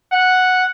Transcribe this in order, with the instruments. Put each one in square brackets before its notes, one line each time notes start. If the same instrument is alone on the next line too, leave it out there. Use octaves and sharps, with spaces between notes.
[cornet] F#5